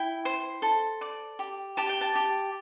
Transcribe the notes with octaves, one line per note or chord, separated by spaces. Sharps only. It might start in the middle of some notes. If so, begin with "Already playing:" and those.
Already playing: E4 G5
C5
A4
D5
G4
G4 A5
G5
A5
G4